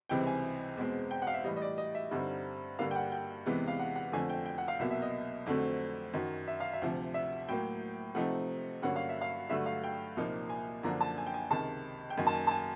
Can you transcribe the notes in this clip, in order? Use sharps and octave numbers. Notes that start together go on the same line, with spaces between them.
C#2 C3 E3 G3 C4 G5
G#5
E2 B2 G#3 C4
G5
F#5
F5
E5
A2 E3 G3 D#5
D#5
D5
D#5
E5
G2 D3 G3 C4 D#4
G2 D3 G3 A#3 F5
G5
F#5
G5
E2 C3 E3 G#3 B3
F5
F#5
F#5
F2 D3 F3 A3 G#5
G5
G5
F#5
F5
C2 B2 F#3 A#3 E5
E5
D#5
F2 D3 F#3 A3 C4
F#2 D#3 F#3
E5
F5
E5
D2 C3 F3
E5
A2 F#3 A#3 G5
C3 F3 A3 C4 D#4 F#5
G2 D3 F#3 A#3 C#4 F#5
F5
E5
F5
G2 D3 F#3 A3 E5
F5
G5
C2 A#2 F3 A#3 D#4
G#5
F#2 D3 F3 A#3 D4 A#5
A5
G#5
G5
G#5
C#2 C3 D#3 A5
G5
F#2 D#3 F#3 A#3 D#4 G#5
A5
G#5
A5
G#5